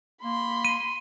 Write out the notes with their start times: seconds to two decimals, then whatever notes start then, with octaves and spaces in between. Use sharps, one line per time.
0.24 A#3 B5 C6
0.65 D#7